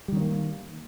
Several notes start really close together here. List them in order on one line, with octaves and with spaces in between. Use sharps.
G3 D#3 C#4 A#3